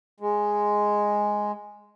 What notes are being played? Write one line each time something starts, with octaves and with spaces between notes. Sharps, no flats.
G#3